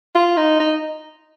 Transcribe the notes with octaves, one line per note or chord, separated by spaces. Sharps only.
F4
D#4
D#4